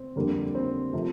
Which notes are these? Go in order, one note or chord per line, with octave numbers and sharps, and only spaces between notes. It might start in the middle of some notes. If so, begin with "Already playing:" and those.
Already playing: C4
F2 D3 G3 A#3
C4
C3 F3 A3